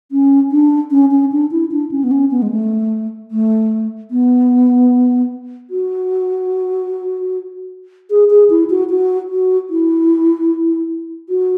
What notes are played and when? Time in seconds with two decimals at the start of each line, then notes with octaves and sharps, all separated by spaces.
0.12 C#4
0.52 D4
0.91 C#4
1.11 C#4
1.32 D4
1.51 E4
1.72 D4
1.91 C#4
2.04 B3
2.11 C#4
2.31 B3
2.42 G#3
2.51 A3
3.31 A3
4.11 B3
5.70 F#4
8.10 G#4
8.30 G#4
8.50 E4
8.70 F#4
8.90 F#4
9.30 F#4
9.70 E4
11.29 F#4